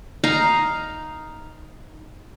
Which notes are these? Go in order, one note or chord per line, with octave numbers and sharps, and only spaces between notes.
D#4 F5 A#5